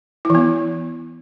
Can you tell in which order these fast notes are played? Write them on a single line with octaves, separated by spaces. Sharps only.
E4 E3 B3